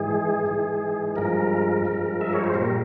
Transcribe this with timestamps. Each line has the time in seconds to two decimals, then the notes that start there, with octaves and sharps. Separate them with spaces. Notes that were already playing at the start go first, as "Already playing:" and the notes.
Already playing: G#2 E3 G#3 G#4
0.46 G#2 E3 G#3
1.16 G2 F3 G#3 A#4
1.85 G2 F3 G#3
2.21 E5
2.33 C#5
2.44 C5
2.54 A#2 G3 A#4